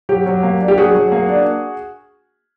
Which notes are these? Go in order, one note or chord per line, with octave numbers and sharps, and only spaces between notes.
F#3 G4
F#3
A#3
D4
G4
F#3 F#4 G#4
F#3
A#3
D4